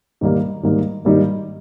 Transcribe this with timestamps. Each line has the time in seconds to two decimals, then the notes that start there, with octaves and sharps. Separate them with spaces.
0.21 G#2 D#3 G3 A#3
0.63 G#2 D#3 G3 A#3
1.05 G#2 D#3 G3 A#3